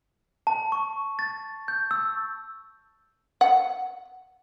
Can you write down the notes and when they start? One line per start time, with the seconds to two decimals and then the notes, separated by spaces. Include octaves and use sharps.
0.47 A5
0.72 C#6
1.19 A6
1.68 G6
1.91 E6
3.41 F#5